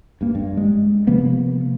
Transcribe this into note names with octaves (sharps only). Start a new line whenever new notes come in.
G2 A#3
G2
G#3
C3 F3 A#3 B3